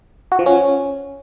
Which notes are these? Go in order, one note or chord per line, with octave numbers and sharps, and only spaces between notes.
F#4
F3
C#4